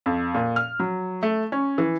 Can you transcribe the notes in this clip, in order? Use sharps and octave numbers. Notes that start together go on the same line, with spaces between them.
F2
A#2
F6
F#3
A3
C#4
E3